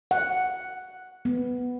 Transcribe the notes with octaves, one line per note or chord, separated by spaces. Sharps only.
F#5
B3